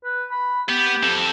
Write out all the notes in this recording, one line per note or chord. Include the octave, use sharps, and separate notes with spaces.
B4
B5
B3 G4
C4 A4